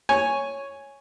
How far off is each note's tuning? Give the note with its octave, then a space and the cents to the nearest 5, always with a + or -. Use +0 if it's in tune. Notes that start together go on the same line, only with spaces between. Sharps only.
C#5 +0 G#5 +0